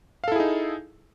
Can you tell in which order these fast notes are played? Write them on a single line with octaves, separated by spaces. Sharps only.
F5 A4 E4 G#4 D#4